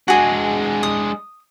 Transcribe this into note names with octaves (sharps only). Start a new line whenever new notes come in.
G#3 D4 F#4 G#4
D#6